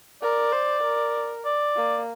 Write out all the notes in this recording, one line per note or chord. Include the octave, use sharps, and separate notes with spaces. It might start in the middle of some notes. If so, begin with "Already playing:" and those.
A#4 D5
C5
A#4
D5
A#3